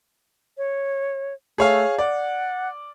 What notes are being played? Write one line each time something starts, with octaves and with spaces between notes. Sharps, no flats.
C#5
A3 G#4 C#5 F5
D5 F#5